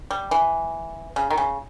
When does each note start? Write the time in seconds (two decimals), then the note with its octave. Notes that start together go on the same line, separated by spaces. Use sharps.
0.11 G3
0.31 E3
1.16 C#3
1.30 D#3
1.38 C#3